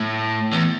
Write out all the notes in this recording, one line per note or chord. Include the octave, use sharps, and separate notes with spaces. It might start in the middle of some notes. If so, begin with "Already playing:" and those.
Already playing: A2
E2